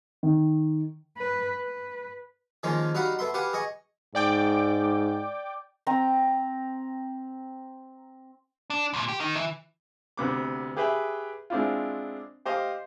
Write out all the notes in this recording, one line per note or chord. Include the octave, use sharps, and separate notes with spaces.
D#3
B4
B4
D#3 F3 G#3 A#3 C#4 F4
G3 D#4 F#4 F5 F#5 B5
A3 B3 E5 C6
G4 B4 F5 F#5 G#5
G#4 D#5 G#5 C#6
G#2 D5 G5 D6
C4 G5 A#5
D4
D2 A#2
G4
D#3 D#4
E3 E4
D2 C3 B3 D6
G4 G#4 B4 E5 G5
G#3 C4 D4 E4 F4
G4 C5 D#5 F5